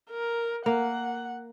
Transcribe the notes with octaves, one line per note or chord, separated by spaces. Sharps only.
A#4
A#3 F#5